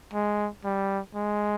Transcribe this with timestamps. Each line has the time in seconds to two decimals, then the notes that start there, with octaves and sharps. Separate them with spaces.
0.13 G#3
0.65 G3
1.15 G#3